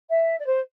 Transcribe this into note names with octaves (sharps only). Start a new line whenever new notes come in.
E5
D5
C5